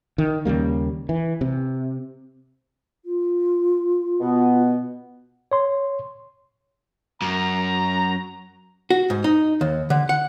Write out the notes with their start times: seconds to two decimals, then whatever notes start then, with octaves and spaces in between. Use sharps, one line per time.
0.18 D#3
0.45 D#2 C#3 G3 A#3
1.09 E3
1.41 C3
3.05 F4
4.20 B2 B3
5.52 C#5 C6
7.22 F#2 A#5
8.90 F#4
9.10 G#2
9.24 D#4
9.61 D#2
9.90 D3
10.09 F#5